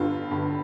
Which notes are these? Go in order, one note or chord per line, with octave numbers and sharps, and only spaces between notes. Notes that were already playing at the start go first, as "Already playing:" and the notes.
Already playing: G1 G2 D3 F4
G1 G2 D3